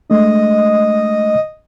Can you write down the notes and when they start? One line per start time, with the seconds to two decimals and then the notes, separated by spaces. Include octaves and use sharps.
0.10 G#3 A3 D4 D#5